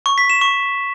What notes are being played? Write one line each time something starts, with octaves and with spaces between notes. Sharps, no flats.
C#6
B6
E7
C#6